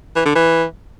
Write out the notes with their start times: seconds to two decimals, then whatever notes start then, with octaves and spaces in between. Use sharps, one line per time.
0.16 E3
0.26 D3
0.35 E3